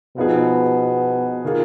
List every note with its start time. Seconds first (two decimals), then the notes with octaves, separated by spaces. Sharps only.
0.17 B2 F3 B3 D#4 G#4
1.44 D#3 A#3 F4 G#4